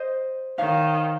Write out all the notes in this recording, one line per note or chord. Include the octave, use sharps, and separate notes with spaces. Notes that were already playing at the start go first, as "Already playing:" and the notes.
Already playing: C5 D#5
D#3 C#5 F5